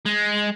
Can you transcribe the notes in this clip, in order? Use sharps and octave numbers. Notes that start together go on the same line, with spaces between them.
G#3